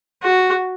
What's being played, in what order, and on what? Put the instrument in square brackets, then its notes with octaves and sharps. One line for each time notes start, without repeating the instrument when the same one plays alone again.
[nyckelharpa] F#4